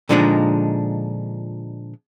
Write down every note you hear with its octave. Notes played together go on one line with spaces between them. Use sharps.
A#2 D3 F3 G#3 D4 D#4